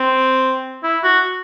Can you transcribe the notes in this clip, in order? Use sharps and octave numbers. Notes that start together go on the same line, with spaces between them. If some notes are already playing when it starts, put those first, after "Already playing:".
Already playing: C4
E4
F#4